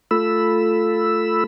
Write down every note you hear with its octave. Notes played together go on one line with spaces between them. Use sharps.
A3 F4 A4 B5 E6